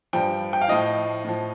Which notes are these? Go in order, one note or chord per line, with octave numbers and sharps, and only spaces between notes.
G2 F3 G5
G5
F5
A2 F3 D#5
A2 F3